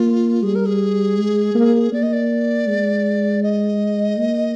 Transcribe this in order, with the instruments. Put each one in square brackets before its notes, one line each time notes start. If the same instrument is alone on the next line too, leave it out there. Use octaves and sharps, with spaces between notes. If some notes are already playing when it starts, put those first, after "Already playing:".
Already playing: [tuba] A#3 [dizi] F4
[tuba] G3 [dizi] G#4
[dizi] A#4
G#4
[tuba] G#3
A#3
[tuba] A#3 [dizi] D5
[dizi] D#5
D5
[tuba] G#3
[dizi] D#5
[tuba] A#3